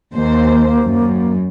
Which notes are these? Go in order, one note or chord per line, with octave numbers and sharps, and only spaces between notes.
D#2 A#3 C5
F#2